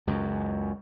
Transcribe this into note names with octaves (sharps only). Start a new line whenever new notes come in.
C#2 F#2